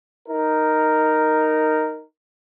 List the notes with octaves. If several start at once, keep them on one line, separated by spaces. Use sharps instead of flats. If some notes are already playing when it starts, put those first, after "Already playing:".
D#4 A#4